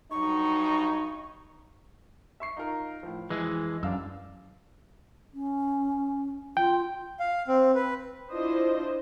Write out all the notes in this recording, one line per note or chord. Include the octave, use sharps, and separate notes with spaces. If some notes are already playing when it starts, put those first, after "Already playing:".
G2 F#3 D#4 C#6
E5 C#6 C7
D#4 F4 A#4
A2 F3
F2 E3 G#3 D#6
F#2 D4 F5 E6
C#4
F4 G5
F5
C4
B4
D4 E4 F4 C5 D#5